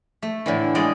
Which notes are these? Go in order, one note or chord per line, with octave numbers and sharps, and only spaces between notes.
A3
A2 D3 E3
G3 G#3 D5 D#5